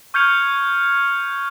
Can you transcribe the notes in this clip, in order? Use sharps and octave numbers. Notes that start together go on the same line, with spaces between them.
C#6 F6 G6 G#6 C#7 F7